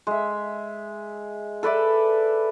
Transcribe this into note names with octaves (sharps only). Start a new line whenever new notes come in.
G#3 E5
A4 B4 D5 E5